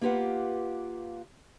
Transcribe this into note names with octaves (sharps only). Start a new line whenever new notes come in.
A#3 F4 G4 B4 F#5